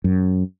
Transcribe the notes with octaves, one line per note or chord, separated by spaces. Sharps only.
F#2